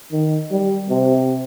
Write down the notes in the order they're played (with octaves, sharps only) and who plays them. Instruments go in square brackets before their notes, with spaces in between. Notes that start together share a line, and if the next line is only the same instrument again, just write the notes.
[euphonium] D#3
G3
C3